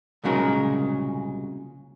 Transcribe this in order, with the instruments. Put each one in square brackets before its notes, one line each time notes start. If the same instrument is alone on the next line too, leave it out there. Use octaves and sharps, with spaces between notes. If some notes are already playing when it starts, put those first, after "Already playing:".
[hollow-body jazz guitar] C2 A#2 C#3 F#3 G#3 A#4